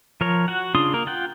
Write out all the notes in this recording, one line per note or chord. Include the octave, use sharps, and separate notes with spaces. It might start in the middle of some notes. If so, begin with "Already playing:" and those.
F3 A#4 C#5
F#4 F#5
C#3 D4 F4 C6 D#6
A#3 A#4
F4 F#5 G5